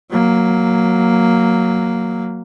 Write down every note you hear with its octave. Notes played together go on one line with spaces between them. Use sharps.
F#3 A#3